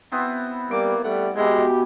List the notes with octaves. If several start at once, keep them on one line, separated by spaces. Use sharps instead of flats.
B3 C4 E4
G3 A#3 D6
G3 A3 F#5
B2 G#3 E4 G4 G#5